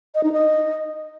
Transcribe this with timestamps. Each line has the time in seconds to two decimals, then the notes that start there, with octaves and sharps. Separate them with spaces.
0.15 D#5
0.24 D#4
0.32 D#5